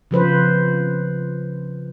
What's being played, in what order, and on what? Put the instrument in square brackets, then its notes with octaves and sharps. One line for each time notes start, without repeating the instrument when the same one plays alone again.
[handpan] C#3 F3 B4 C5